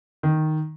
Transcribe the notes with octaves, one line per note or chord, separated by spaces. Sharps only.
D#3